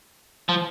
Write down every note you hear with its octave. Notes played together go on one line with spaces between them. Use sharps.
F3